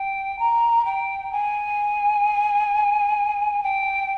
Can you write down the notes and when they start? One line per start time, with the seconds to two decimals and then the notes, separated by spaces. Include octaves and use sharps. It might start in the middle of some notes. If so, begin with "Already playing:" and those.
Already playing: G5
0.39 A#5
0.85 G5
1.32 G#5
3.63 G5